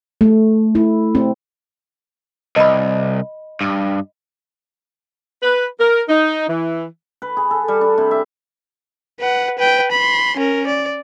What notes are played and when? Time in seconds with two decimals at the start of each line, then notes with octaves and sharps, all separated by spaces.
0.21 A3
0.75 E4
1.15 C4
2.56 C2 D#5 B5
3.61 G2
5.43 B4
5.80 A#4
6.09 D#4
6.48 E3
7.22 B4
7.37 G#4
7.51 A4
7.68 G3
7.81 D4
7.98 C3
8.11 E5
9.20 B4 F#5
9.59 B4 G5
9.92 B5 C6
10.37 C#4 A#4
10.67 D5